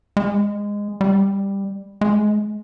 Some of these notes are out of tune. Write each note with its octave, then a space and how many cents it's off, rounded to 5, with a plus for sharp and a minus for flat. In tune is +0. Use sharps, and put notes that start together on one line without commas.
G#3 -15
G3 +10
G#3 +25